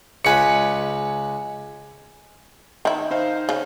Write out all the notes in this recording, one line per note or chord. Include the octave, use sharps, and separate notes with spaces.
C#2 B4 G#5 C#7
D#3 E4
D#4 C5 F5
C#3